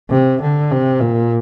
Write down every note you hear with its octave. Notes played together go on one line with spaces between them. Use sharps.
C3
D3
C3
A#2